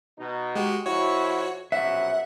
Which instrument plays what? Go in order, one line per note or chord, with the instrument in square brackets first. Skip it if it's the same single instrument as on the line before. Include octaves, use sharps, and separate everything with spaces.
[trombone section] B2 D#4
[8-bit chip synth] G#3 F#4 G4
[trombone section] F2 E4 [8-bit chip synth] F#4 C#5
[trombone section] A#1 F#2 B2 [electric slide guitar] E5 [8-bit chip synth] F#5